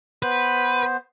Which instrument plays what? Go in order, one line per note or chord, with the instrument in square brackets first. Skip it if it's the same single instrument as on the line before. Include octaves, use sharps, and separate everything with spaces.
[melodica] B3 C5 [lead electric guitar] B4